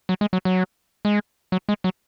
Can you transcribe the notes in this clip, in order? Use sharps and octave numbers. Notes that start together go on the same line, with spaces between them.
F#3
G#3
F#3
F#3
G#3
F#3
G#3
F#3